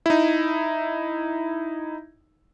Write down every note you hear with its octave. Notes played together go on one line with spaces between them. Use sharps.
D#4 E4